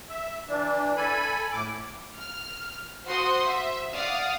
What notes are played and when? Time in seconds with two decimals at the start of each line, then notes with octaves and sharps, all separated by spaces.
0.10 E5
0.49 E3 D4
0.97 A4 G#5 B5
1.52 A2 D6
2.18 F6
3.07 F#4 C5 F#5 C6 D#6
3.47 E5
3.93 D5 F5 F#5 D#6 F6